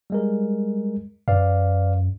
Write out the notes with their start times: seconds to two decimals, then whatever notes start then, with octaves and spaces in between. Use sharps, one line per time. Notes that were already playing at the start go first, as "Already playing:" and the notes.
0.10 G3 G#3 A#4
1.28 F#2 B4 D5 F5